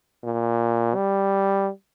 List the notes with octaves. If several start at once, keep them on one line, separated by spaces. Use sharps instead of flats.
A#2
G3